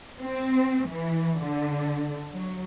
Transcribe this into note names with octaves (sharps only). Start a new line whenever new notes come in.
C4
E3
D3
F#3